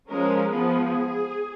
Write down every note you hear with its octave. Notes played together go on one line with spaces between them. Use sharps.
F3 G#3 C#4 A#4
F3 B3 G#4